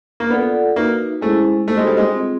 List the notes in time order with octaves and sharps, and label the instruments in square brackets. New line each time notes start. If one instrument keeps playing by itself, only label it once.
[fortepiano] A#3
[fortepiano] B3 [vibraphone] F4 A4 D5 F#5
[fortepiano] A#3 [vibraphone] D#4 F#4 B4 E5
[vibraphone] G#3 C#4 E4 G#4 C5 [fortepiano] A3
[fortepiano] A3 [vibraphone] D#4 F#4 A4 C5
[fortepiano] G#3
G3
G#3
[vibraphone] C4 F4 G#4